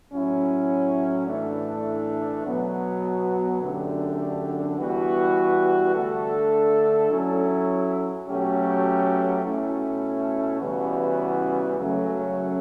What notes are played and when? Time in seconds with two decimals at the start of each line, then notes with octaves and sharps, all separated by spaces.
0.10 A2 F#3 C#4 E4
1.27 A2 E3 A3 D4
2.43 B2 F#3 B3
3.60 F#2 D3 A3 D4 G4
4.76 E3 G3 B3 F#4 B4
5.93 D3 A3 D4 A4
7.10 F#3 C#4 E4 A4
8.27 B2 F#3 A3 C#4 G4
9.44 B2 A3 C#4 E4
10.60 C#3 E3 G3 B3 F#4
11.77 F#2 C#3 F#3 A3 C#4